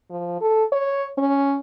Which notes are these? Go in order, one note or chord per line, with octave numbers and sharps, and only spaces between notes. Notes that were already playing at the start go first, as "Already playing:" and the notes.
F3
A4
C#5
C#4